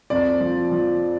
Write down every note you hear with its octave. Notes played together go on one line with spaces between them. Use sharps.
F2 D5
F3
F3